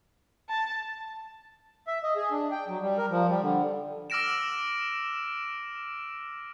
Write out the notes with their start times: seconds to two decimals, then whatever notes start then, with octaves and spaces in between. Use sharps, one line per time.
0.49 A5
1.87 E5
2.03 D#5
2.16 G#4
2.32 D4
2.51 G5
2.68 F#3
2.82 G3
2.98 A#4
3.11 F3
3.28 G3
3.42 D3
4.10 D6 E6 F6 A#6 D7 E7